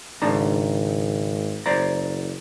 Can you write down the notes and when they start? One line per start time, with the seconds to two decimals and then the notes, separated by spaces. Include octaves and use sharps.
0.22 G#1 C#2 D4 A#5
1.66 F#1 C5 D5 A#5